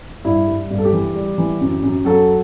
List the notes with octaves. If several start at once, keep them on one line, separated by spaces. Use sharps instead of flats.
G2 E4
G3
G2
A4
G4
E3
G3
E3
F#2
F#2
F#3 A4